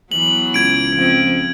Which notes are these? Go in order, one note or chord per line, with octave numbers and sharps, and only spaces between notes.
E3 F#3 B3 F#7
C#2 G#6 D7
F2 C4